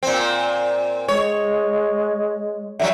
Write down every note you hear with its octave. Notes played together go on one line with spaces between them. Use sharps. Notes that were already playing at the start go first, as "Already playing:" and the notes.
A#2 C4
G#3 C#5
D3 F#3 G3 E5